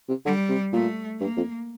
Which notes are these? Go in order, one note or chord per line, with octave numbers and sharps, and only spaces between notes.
C3
D3 G3
C3
A#2 A3
G2 A#3
F2